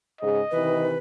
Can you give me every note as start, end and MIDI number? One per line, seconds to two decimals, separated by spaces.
0.21 0.39 44
0.21 0.39 49
0.21 0.39 68
0.21 0.89 75
0.51 0.95 48
0.51 0.95 51
0.51 0.95 52
0.51 0.98 71